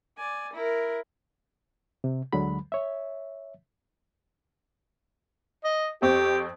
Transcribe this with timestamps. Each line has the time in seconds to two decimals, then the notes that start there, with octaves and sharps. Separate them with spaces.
0.18 D5 G#5
0.53 E4 A#4
2.04 C3
2.33 D2 D3 F#3 G#3 B5
2.72 C#5 E5
5.64 D#5
6.02 F2 C4 G4 C#6